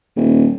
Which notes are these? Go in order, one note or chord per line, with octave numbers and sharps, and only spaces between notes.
D#1